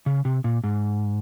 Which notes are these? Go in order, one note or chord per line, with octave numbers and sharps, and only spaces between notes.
C#3
C3
A#2
G#2